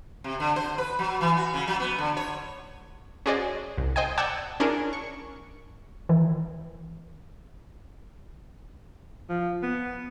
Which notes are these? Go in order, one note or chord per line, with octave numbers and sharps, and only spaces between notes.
C3
D3
C5
B4
F#3
E3
F#4
C#3
F#3
B3
D3
C#5
C#4 F#4 G#4 C5 D5 D#5
C2
C5 D#5 G5 G#5
D5 F#5 G5 A5 E6 G#6
C#4 D4 E4 G#4 A#4
C#6
D#3 E3
F3
B3